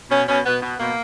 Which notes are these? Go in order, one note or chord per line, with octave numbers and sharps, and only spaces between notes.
B2 C#4
B2 C#4
B2 B3
B2 B3
B2 A#3